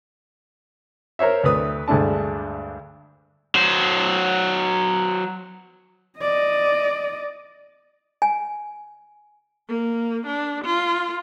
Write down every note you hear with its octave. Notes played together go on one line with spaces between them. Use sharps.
A#4 C5 C#5 E5
D2 A3 B4 D#6
D2 G2 G#3 A3 D4 A5
F#3 C5
D5 D#5
G#5
A#3
D4
F4